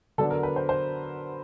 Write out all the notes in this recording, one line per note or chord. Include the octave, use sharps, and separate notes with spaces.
D3 F#3 B3 D4 A4
A#4
B4
C5
C5